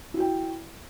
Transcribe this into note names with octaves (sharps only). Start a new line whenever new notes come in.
E4 F#4 G5